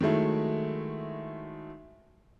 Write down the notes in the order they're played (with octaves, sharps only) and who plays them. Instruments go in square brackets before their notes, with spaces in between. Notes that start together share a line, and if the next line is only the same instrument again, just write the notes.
[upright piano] D#3 F#3 G#3 A3 E4